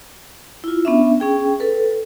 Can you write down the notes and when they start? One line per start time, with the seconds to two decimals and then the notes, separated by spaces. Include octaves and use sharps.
0.64 E4 F4
0.85 B3 C#4 D4 E5
1.20 C#4 G#4 G5
1.60 A4 B4